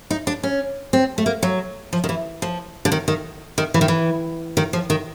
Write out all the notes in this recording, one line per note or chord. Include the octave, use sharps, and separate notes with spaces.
D#4
D4
C#4
C4
A3
A#3
F#3
F3
D#3
E3
F3
D3
D#3
D#3
D#3
E3
D#3
E3
D#3
F3
D#3